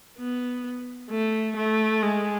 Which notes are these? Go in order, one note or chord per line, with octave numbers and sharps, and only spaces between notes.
B3
A3
A3
G#3